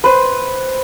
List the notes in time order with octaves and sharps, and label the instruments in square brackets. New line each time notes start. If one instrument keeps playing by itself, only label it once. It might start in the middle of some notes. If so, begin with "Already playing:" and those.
[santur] B4 C5